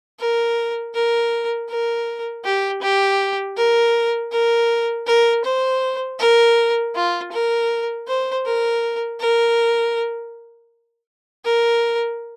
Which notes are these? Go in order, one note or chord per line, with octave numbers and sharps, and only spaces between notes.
A#4
A#4
A#4
G4
G4
A#4
A#4
A#4
C5
A#4
F4
A#4
C5
A#4
A#4
A#4